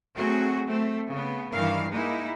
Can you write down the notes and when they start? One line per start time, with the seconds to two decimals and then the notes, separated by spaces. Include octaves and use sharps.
0.15 F#3 A3 C4 F#4 G#4
0.66 A3 C4
1.09 C#3 B3
1.52 G2 D#3 E3 A#4 F5
1.90 G#3 A#3 D#4 E4